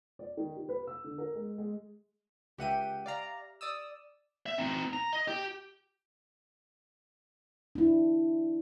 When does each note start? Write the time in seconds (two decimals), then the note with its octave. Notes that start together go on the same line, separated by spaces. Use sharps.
0.19 D5
0.37 D#3
0.56 G4
0.69 B4
0.87 E6
1.04 D3
1.18 A#4
1.35 G#3
1.58 G#3
2.58 C#2 G4 E5 F#5 G5 D#7
3.06 D5 F5 A#5
3.61 D5 D#6 E6
4.46 E5
4.58 C4 D#4
4.93 A#5
5.13 D#5
5.28 G4
7.75 D4 E4